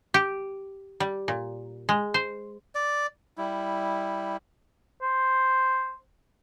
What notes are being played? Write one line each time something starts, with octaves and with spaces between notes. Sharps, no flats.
G4
G3
A#2
G#3
C5
D5
G3 E4
C5